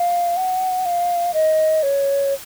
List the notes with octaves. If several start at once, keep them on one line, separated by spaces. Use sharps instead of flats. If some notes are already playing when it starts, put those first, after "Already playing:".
Already playing: F5
F#5
F5
D#5
C#5